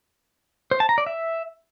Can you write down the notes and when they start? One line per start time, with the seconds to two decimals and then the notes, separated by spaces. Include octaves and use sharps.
0.71 C5
0.80 A5
0.89 A#5
0.98 D5
1.07 E5